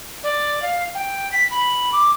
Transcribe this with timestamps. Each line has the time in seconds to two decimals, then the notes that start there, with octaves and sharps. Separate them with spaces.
0.23 D5
0.62 F5
0.95 G5
1.32 B6
1.51 B5
1.92 D6